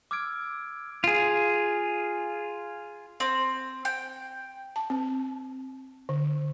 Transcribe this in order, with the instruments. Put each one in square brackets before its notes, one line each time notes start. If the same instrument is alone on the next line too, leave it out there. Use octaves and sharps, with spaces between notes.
[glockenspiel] D6 E6 F6 G#6 D7
[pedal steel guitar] F4 G#4
[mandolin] C4
G5
[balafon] A5
C4
D3